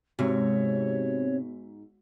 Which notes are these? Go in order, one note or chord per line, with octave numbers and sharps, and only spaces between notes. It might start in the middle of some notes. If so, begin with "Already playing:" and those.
G#2 C3 G#3 B3 F#4 C#5